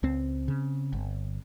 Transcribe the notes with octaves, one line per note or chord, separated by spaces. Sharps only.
C#2 C4
C#3
G1